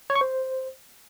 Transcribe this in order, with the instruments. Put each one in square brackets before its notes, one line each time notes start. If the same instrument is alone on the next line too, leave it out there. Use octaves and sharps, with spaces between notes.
[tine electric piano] C#5
C#6
C5